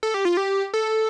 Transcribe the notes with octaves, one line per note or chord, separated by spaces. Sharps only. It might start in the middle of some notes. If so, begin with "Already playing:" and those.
A4
G4
F4
G4
A4